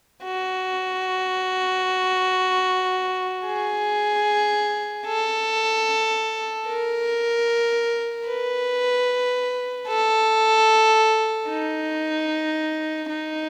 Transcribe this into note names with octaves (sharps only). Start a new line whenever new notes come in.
F#4
G#4
A4
A#4
B4
A4
D#4
D#4